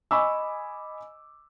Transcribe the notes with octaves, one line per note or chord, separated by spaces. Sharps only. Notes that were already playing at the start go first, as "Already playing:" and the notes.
D#5 G#5 B5 C#6 D6 E6